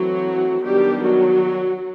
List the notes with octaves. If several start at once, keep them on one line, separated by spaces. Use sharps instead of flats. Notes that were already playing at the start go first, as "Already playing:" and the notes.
Already playing: E3 F#3 A3 C4 F#4
D#3 F#3 G3 B3 D4 G4
F#3 F#4